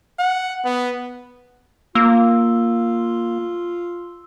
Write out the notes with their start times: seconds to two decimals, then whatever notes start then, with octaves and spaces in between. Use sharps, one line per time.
0.19 F#5
0.65 B3
1.95 A#3 F4 E6